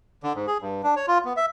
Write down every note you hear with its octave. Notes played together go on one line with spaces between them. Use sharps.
D3
G#2
G#4
G2
D4
C#5
F4
B3
E5